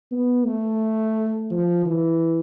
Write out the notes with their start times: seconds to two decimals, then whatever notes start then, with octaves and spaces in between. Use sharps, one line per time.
0.11 B3
0.45 A3
1.51 F3
1.86 E3